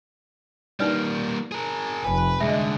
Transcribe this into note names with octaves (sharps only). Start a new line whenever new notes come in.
G3 A#3 D#4 B4 D5
G#4 A#4
F1 B4 G#5 A5
C2 D3 G#3 E5 A5